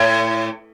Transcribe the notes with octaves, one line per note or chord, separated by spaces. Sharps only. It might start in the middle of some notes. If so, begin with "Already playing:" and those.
Already playing: A2